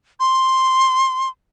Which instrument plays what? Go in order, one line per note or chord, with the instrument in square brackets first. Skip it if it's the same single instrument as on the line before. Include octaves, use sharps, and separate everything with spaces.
[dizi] C6